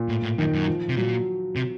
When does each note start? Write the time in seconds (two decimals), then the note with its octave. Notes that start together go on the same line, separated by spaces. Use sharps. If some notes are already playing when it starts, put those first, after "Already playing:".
Already playing: A#2
0.09 A2
0.23 A2
0.38 F#2 D#3
0.53 F#2
0.68 F3
0.89 C3
0.97 A#2 F#3
1.56 C3